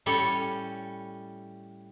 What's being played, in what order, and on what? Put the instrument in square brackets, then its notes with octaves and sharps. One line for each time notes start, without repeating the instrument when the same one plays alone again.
[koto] A2 G3 C#4 A4